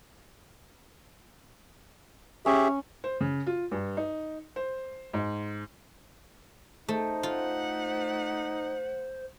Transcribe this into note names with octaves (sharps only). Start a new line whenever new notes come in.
C#4 G4 G#4 E5
C5
C#3
F4
G2
D#4
C5
G#2
A3 D#4 C5
A3 F4 F#5